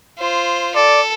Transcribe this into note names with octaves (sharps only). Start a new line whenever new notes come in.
F4 C5
A4 D5